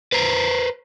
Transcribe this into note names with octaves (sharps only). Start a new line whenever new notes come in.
B4 C5 A#5